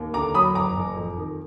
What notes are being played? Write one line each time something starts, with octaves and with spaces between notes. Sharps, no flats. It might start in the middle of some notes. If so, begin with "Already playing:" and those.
Already playing: D#2
D3 A#5 D6
F#3 B5 D#6
F#1 A#5 D6
F#1
F2
D#3